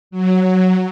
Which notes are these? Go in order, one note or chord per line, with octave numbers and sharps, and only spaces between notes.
F#3